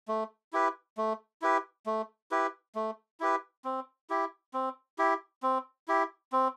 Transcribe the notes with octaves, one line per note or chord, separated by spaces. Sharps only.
A3
E4 G4 B4
A3
E4 G4 B4
A3
E4 G4 B4
A3
E4 G4 B4
C4
E4 G4
C4
E4 G4
C4
E4 G4
C4